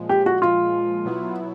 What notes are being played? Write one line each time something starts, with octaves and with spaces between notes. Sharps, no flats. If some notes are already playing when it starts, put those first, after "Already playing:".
Already playing: A#2 F3 G#3
G4
F#4
F4
B2 F#3 B3 E4